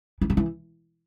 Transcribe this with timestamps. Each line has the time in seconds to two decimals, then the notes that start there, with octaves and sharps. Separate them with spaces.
0.21 E3
0.30 F3
0.37 E3